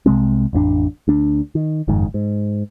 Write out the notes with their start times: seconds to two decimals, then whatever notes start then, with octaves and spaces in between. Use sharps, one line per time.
0.06 C2 C3 G#3 C4
0.53 A1 F2 B3 D4
1.08 D2 D4
1.55 D#3
1.88 F#1 F2 G#2 D#3
2.14 G#2